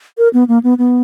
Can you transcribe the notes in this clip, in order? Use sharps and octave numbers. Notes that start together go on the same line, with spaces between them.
A#4
B3
A#3
B3
B3